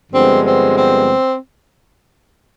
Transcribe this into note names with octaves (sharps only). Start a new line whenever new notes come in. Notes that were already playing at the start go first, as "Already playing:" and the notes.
G2 D3 F3 G#3 B3 C4
C4
C4